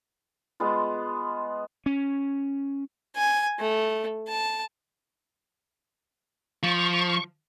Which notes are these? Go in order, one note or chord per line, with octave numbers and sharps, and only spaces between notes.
G#3 B3 F4
C#4
G#5
A3
A5
F3 C#6